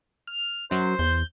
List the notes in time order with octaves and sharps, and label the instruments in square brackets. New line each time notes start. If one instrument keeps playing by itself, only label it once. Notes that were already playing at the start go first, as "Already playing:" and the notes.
[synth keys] F6
[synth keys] F#2 F#3 [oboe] C5
[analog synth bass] E2 [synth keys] G6